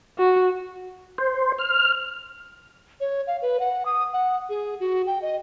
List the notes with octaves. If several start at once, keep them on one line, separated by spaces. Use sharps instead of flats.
F#4
C5
F6
C#5
F5
B4
F#5
D#6
F#5
G#4
F#4
G5
D#5